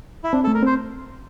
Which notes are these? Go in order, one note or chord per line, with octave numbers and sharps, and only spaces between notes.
E4
C4 D4
A4
A3
A#4
C4 C5